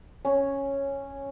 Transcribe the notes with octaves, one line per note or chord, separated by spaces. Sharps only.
C#4